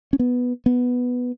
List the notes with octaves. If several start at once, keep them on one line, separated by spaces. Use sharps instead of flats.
C#4
B3
B3